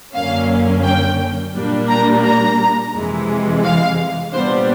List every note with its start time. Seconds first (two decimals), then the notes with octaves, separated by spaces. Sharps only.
0.15 F#2 D3 F#3 A#3 C#4 F5
0.84 G5
1.55 A#2 G3 A#3 D4
1.89 A#5
2.24 A#5
2.94 F2 C3 E3 G#3
3.64 F5
4.33 A#2 G3 B3 D4 C5